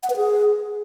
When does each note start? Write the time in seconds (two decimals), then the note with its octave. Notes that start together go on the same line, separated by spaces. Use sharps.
0.03 F#5
0.10 B4
0.17 G#4